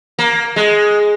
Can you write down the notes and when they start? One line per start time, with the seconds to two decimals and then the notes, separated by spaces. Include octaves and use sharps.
0.19 A#3
0.56 G#3